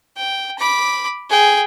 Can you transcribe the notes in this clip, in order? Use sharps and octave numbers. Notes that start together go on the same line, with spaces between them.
G5
B5 D6
G#4 G5